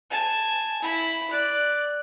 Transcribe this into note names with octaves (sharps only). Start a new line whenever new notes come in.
G#5 A5
E4 B5
D5 F#6